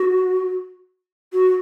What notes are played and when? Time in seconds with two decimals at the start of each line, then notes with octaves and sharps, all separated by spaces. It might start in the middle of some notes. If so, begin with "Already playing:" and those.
Already playing: F#4
1.33 F#4